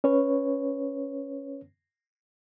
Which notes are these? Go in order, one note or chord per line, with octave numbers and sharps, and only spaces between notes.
C#4 B4 C#5